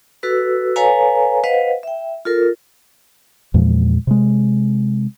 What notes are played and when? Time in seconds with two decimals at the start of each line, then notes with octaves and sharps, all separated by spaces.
0.23 F#4 A4 B4 E6
0.76 A4 B4 C#5 F5 G#5 A#5
1.44 B4 C5 D#5 F5 F#5
1.83 E5 G5
2.25 F4 A4 A#4
3.54 E2 A#2 F3 G#3
4.07 C3 G#3